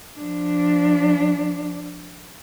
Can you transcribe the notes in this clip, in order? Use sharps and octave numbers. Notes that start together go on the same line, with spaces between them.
F3 D4